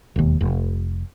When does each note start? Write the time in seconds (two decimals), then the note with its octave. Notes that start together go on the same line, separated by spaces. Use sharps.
0.16 E1 D#2
0.41 F1